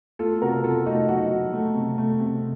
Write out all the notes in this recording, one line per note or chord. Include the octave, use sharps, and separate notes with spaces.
A3 F4 A4
C3 F#4 A#4
C3 F4 A4
A3 D#4 F#4
F#3 D#4 F#4
F#3
A3
C3
A3
C3